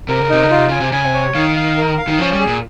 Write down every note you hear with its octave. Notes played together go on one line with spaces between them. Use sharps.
C3 A#4
C#3
C3 D#4
C#3
F4
C3
C#3 G#5
C3
C#3 G#5
C3
C#5
D#3 F5
F5
A#4
F5
D#3
F3 C#4
G3
G#4
A#2